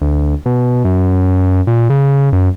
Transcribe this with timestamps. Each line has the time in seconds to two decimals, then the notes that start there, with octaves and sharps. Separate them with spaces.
0.02 D2
0.46 B2
0.85 F#2
1.67 A#2
1.90 C#3
2.33 F#2